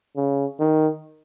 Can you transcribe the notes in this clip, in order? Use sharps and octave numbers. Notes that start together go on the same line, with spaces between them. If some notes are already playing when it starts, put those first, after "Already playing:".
C#3
D#3